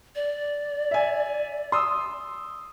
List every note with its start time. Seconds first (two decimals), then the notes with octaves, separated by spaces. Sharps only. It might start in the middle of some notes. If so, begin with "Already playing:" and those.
0.16 D5
0.91 E5 G#5
1.72 C6 D#6 E6